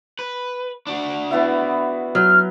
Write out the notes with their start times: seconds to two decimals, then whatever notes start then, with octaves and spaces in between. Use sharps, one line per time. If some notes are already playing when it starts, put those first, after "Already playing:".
0.19 B4
0.87 D4 F#4
1.31 E3 B3 E4
2.15 F#3 F6